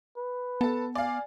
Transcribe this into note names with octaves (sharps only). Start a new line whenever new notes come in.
B4
B3 A4 A5
D5 F5 G#5